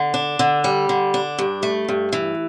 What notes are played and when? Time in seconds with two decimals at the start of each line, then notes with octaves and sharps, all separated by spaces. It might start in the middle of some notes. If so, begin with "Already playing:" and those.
Already playing: D3
0.14 D4
0.39 D3
0.64 G3
0.89 D3
1.14 D4
1.39 G2
1.63 A3
1.89 G2
2.13 E3